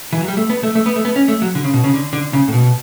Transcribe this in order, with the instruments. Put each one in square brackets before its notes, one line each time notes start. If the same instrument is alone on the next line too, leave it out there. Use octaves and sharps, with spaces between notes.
[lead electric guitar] E3
F#3
G3
A3
B3
A3
A3
B3
A3
B3
C#4
A3
F#3
D3
C#3
B2
C#3
D3
D3
C#3
A2
B2